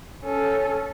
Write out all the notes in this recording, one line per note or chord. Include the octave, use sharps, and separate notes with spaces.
C#4 A4